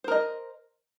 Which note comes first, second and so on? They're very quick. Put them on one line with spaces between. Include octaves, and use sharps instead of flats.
C5 A#4 D#5